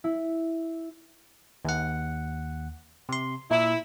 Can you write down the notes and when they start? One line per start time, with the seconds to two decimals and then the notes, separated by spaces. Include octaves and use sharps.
0.04 E4
1.65 D#2 F#5
3.09 C3 C6
3.51 A#2 E4